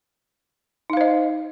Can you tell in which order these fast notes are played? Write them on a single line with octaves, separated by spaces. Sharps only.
D#4 F5 C5 D#5